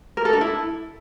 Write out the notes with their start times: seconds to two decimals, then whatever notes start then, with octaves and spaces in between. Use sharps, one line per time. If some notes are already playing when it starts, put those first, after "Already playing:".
0.17 A#4
0.25 A4
0.33 D4
0.41 E4